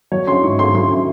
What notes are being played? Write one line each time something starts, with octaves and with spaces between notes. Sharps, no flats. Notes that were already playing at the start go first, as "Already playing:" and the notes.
F#3 C#5
C#4 C6
G#2 C#6
G#2 C6
F#3 C6
C#4